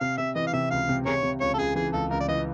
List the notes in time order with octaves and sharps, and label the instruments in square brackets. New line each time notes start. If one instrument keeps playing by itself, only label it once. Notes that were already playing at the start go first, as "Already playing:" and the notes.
[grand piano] C3 [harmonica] F5
[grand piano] C3 [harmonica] E5
[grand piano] E3 [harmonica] D#5
[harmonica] F5
[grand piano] C3 [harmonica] E5
[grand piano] C#2 [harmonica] F5
[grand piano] C3
[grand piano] C3 [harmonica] G#4 A#4 C#5
[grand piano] C3
[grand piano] C#2 [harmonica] C#5
[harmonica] A4
[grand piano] C#2 [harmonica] G#4
[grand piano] E3 [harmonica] G#4
[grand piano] C#2 [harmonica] A4
[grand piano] C#2 [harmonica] A#4
[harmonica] D5
[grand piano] E3 [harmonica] D#5